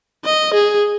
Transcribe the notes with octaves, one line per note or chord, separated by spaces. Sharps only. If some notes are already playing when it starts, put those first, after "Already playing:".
D#5
G#4